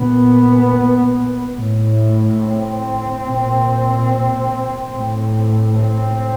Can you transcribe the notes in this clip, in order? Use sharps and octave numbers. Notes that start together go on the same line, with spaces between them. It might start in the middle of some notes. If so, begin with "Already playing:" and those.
Already playing: A#2 B3
A2
C4
A#2
A2
C4